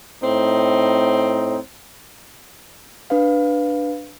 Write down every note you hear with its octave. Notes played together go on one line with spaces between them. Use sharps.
A2 C4 D#4
D4 B4 F5